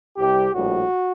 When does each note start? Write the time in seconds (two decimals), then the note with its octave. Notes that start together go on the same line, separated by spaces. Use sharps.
0.17 C2 C3 G3 G4
0.54 A#1 A2 G3 F#4